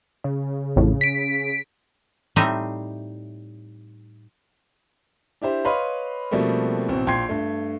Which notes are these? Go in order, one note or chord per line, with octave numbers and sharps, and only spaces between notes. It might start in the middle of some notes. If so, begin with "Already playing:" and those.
C#3
A1 F2 A2
B6 D7
A2 G3 C4 D#4 D#5 E5
D4 E4 G4 C5
B4 C#5 D#5 F5 B5 C6
B2 F3 G3 A3 A#3 C4
A1 B2 C4
A#1 G5 C6 G#6 C7
G2 A3